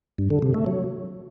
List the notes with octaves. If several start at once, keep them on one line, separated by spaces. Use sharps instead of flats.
G2
D3
C3
A3
F#3